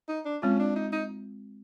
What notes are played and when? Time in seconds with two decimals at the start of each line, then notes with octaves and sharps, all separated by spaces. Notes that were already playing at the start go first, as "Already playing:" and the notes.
0.09 D#4
0.25 D4
0.42 G#3 C4 C#4 F4
0.59 D4
0.76 D#4
0.92 D#4